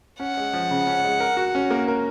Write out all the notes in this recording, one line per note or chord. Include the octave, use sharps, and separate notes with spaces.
C#4 F#5
G#3
F3
C#3
C#4
G#3
A#4
F#4
C#4
A#3
A#4